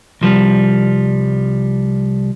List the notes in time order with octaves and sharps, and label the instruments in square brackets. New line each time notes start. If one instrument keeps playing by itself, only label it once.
[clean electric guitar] C2 F3 G3